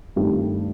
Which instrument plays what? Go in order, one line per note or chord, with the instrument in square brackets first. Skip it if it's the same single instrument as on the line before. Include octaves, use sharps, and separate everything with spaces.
[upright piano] G2 D#3 A3 C4 G4